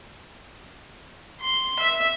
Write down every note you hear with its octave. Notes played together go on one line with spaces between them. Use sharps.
C6
E5